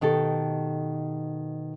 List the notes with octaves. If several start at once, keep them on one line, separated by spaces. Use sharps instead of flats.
B2 D#3 G4 A4